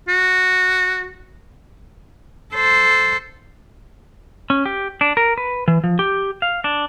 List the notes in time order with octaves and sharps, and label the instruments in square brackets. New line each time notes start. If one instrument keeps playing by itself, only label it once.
[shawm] F#4
[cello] A4 C5
[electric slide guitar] C#4
G4
D4
A#4
B4
E3
F3
G4
F5
D4